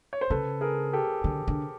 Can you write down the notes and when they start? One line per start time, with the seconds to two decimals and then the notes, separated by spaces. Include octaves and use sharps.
0.13 C#5
0.21 C5
0.30 C#3 A4 B4
0.61 G#4 A#4
0.93 G4 A4
1.24 D3
1.48 D3